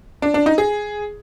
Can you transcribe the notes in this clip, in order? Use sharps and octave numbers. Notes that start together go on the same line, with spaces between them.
D4
D4
D#4
G#4